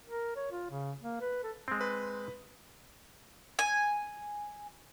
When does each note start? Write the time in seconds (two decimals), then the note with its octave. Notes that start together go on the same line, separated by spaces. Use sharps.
0.07 A#4
0.36 C#5
0.52 F4
0.71 C#3
1.01 A#3
1.21 B4
1.43 A4
1.68 G#3 C4
1.81 B4
3.59 G#5